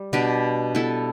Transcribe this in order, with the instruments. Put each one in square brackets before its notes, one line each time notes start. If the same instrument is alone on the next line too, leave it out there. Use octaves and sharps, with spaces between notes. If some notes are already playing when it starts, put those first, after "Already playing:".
Already playing: [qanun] G3
B2 B3 D4 G4
G3 B3 E4 A4